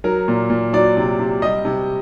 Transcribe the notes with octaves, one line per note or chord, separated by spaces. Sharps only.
F#3 A#4
A#2
A#2
F#3 D5
C3
C3
G3 D#5
C3